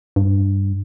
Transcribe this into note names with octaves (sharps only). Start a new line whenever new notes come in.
G2